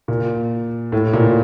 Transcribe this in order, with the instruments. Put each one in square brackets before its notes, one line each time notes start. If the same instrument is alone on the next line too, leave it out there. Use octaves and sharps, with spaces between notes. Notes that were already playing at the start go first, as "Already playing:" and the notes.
[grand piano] A#2
A2
A#2